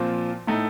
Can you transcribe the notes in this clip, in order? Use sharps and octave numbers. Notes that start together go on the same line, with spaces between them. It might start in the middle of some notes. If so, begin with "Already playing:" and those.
Already playing: A#2 F3 C4 F4
A2 A3 D#4